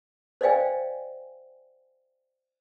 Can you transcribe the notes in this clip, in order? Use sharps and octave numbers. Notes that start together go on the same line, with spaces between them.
C5 D5 D#5 F5 G5 G#5